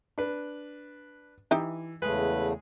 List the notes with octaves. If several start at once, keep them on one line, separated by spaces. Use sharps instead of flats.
D4 B4
E3 D#4 G4 E5
E2 C#3 G#3 A3 G#4 B4